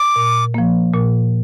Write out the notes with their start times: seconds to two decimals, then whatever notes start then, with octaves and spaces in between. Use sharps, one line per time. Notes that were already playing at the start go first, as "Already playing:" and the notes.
Already playing: D6
0.16 A#2
0.54 F3 A#3
0.93 A#2